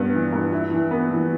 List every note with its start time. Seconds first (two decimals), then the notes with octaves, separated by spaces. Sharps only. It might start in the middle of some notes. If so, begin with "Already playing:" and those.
Already playing: G2 B3
0.13 E3
0.33 G2
0.52 E4
0.72 E3
0.91 B3
1.11 E3